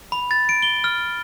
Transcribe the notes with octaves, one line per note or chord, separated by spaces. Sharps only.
B5
A6
D7
G7
F6